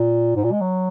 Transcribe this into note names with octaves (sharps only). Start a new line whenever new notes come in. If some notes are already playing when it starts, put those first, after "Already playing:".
Already playing: A#2
G#2
A#2
G#3
F#3